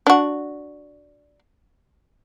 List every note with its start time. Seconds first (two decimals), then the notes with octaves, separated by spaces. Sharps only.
0.07 D4 F#4